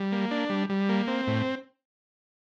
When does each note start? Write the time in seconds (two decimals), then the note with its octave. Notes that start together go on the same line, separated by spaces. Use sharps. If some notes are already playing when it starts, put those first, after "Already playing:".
Already playing: G3
0.12 A#3
0.31 D4
0.50 G3
0.69 G3
0.89 A#3
1.07 C4
1.27 A2